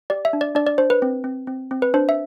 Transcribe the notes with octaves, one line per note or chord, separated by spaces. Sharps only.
G4 D5
E5
D4
D5
D4 D5
D5
D4 C5
B4
C4
C4
C4
C4
B4
D4 C5
E5